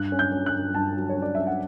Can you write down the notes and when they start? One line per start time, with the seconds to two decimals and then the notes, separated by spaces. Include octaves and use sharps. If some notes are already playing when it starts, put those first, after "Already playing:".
Already playing: G2 F#6
0.12 C#4
0.19 G6
0.32 C#4
0.46 F#6
0.54 G2
0.74 G2 A5
0.96 F#3
1.09 C#5
1.16 C#4
1.22 D5
1.35 C#4 E5
1.47 F#5